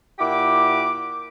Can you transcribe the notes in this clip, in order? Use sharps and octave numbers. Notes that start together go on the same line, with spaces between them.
A#2 E4 G4 F#5 D6